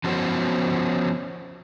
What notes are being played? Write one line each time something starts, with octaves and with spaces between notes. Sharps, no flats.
F3 B3 C#4 F#4 C5